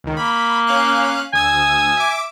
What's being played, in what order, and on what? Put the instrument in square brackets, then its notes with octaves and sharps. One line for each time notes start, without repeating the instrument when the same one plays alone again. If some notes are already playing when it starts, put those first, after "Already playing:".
[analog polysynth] C#2 D#3
[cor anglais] A#3 [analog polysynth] B5
[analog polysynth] C#4 F5 F#6
[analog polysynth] D2 D#6 E6 [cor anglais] G#5
[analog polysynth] E5 D6